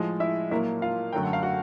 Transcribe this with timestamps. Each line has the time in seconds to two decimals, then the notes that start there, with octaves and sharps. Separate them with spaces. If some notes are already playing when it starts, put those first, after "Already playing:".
Already playing: A2 F3 G#3
0.20 E4 E5
0.51 A#2 F#3 A#3 E4 E5
0.82 F4 F5
1.13 F#2 D3 F#3 A3 G5
1.23 F#5
1.33 F5
1.43 F#4 F#5